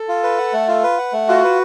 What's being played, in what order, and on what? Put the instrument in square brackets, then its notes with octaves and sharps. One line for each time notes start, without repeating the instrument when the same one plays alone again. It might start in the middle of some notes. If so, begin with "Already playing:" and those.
Already playing: [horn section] A4
[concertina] F4
B4
F#5
A3
F4
B4
F#5
A3
[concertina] F4 [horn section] F#4
[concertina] B4